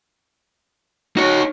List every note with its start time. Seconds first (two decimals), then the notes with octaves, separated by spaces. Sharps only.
1.17 D#4 F#4 C#5